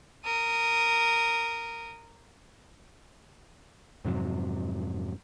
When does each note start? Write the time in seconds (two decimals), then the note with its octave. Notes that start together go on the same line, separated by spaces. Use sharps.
0.25 A#4 D#6
4.05 F2 G#2 C3 F#3